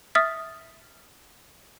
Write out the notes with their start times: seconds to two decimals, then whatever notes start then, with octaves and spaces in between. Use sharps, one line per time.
0.15 E5 D#6 F6 A6 B6